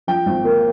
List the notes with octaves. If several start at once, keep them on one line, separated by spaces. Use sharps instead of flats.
F3 G5
G#1
A#3